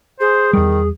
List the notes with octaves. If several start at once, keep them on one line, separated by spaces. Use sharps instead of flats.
G#4 C5
E2 D#3 G3